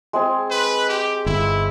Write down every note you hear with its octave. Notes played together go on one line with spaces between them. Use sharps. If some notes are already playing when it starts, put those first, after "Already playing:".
G#3 C4 G#4
B4
G4
G1 E4